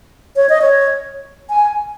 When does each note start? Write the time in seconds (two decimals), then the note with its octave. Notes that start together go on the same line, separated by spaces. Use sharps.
0.36 C#5
0.49 D#5
0.62 C#5
1.50 G#5